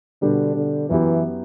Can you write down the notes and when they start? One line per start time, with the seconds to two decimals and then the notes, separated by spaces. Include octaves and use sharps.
0.21 B2 D3 G3 D4 G4 B4
0.55 D3
0.89 F#2 E3 F#3 B3 E4 G4